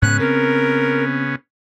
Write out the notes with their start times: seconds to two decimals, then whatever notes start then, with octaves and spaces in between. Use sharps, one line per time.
0.02 G#2 C#3 B3 C#4 F#6
0.19 C4 A#4